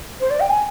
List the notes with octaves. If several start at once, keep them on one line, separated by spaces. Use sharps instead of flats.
C5
D5
G5
G#5